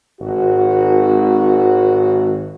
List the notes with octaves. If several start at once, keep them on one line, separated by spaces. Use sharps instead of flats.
G#1 F#4